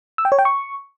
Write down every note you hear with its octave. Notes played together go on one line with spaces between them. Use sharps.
E6
G5
C#5
G5
C#6